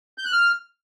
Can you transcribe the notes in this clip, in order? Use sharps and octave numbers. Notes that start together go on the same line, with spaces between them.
G6
F#6
F6